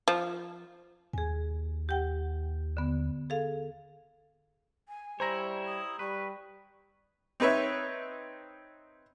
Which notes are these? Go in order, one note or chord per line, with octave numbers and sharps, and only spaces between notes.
F3
D#2 G#4 G#5
G4 F#5 G5
D3 B3
G#4 A4 F5
G#5
G3 E4 C5 C#5 A#5 A#6
D#6
G3 B4 C#6
C4 D#4 B4 C#5 E5